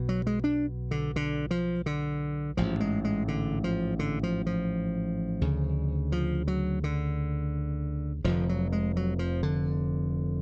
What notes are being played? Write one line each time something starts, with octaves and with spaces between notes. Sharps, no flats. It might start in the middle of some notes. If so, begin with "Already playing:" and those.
Already playing: B1 B2
F#3
G#3
D4
D3
D3
F3
D3
A1 G#2 F3
G#3
G#3
D3
F3
D3
F3
F3
D2 C#3
F3
F#3
D3
F1 F2 D3 F3
F#3
G#3
F#3
F3
D3